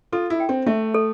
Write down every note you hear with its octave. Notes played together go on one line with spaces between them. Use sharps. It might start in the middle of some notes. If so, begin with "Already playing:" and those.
F4 A4
E4
G5
C4
A3 E5
A4